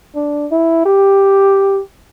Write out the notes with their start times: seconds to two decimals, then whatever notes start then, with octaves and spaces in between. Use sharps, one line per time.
0.15 D4
0.51 E4
0.86 G4